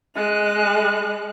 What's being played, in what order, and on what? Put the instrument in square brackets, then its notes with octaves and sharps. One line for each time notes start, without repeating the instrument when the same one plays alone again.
[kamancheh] G#3 F#6